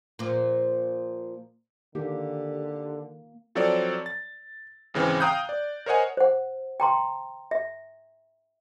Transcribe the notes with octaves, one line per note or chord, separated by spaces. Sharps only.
A#2 F3
D3 D#3 A#3 G4
F3 F#3 C4 A4 C#5 D5
A6
G#1 C#3 E3 C4
F5 G5 A#5 D#6 F#6 G6
D5
A#4 C5 C#5 D#5 F#5 G#5
C5 F#5
G5 A#5 C6
E5